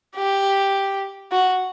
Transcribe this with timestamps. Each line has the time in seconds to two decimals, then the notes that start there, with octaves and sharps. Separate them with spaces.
0.16 G4
1.31 F#4